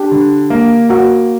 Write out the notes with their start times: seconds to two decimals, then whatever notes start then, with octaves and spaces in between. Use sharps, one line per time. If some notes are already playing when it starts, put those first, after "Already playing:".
Already playing: D4 G4
0.11 D3
0.50 A#3
0.89 A#3 F#4